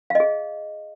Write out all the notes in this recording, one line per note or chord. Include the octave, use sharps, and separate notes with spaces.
G#4 D#5 F5